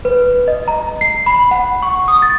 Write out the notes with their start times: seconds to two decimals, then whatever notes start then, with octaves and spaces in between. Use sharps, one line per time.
0.05 B4
0.48 D#5
0.68 A#5
1.01 C7
1.26 B5
1.51 F#5
1.82 C#6
2.08 D#6
2.22 A6